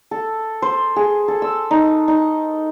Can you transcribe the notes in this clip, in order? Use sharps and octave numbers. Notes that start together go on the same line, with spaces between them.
A4
C5
G#4
A4
E6
D#4
D#4